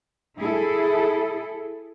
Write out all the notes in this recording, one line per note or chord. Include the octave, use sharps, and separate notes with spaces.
E4 G#4 A4